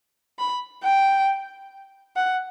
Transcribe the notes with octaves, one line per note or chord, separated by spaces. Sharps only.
B5
G5
F#5